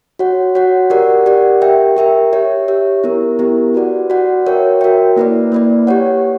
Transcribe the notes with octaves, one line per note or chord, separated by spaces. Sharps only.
F#4 C#5 F#5
F#4 C#5 F#5
G4 A#4 D5 F#5
G4 A#4 D5 F#5
G4 A#4 E5 G5
G4 A#4 E5 G5
G4 C#5 E5
G4 C#5 E5
B3 E4 G4 A#4
B3 E4 G4 A#4
F#4 B4 D5 F#5
F#4 B4 D5 F#5
F#4 A#4 C#5 E5 G5
F#4 A#4 C#5 E5 G5
A#3 E4 B4 D5
A#3 E4 B4 D5
G4 C#5 F#5